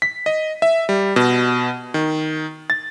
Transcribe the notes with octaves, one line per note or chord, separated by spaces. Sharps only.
B6
D#5
E5
G3
B2
D#3
A6